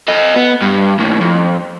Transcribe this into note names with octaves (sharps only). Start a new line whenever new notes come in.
A4 D#5
B3
G2
D#2 A2
F2